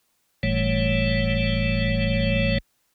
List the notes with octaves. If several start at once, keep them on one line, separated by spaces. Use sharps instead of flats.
F#1 A2 E3 G3 A3 C#5